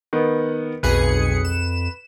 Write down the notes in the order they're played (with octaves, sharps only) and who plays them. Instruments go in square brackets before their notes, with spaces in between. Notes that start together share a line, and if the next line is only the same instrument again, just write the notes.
[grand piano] D#3 B3
[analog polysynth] B1 G#4 C#7 [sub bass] F2 [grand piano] B4
[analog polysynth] E7